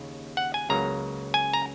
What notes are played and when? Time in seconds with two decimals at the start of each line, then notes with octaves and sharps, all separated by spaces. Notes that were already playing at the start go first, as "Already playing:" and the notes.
Already playing: D#2 C#3
0.37 F#5
0.54 G#5
0.70 C#2 C#3 F#3 A#3 A#5
1.34 G#5
1.53 A#5